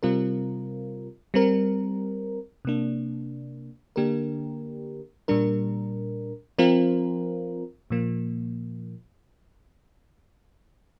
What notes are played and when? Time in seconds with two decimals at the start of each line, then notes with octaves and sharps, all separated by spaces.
0.03 C3 G3 C4 F4 A#4
1.34 G3 C4 A#4
2.65 C3 A#3 D4
3.96 D3 A#3 D4 G4 A#4
5.28 A#2 G3 D4 A#4
6.59 F3 C4 F4 A#4
7.90 A#2 F3 A#3